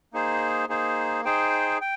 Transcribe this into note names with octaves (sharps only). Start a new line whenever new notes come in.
A#3 D#4 G#4 C5
A#3 D#4 G#4 C5
D#4 G#4 C5 G5
G5